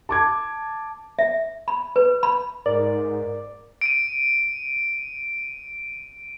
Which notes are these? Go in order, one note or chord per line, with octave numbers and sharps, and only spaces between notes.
A5 D6 G#6
E5
B5
B4
B5
G#2 A#4 D5
D7 D#7